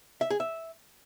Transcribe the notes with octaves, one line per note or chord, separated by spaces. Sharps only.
E5
G#4
E5